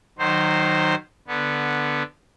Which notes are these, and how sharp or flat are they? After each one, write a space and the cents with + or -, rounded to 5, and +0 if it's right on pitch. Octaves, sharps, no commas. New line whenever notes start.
D#3 -20 F#3 +0 C5 +0
D3 +0 B3 -10